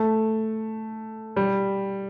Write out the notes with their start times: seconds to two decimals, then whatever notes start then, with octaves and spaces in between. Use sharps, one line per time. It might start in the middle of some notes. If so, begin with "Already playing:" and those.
Already playing: A3
1.36 G3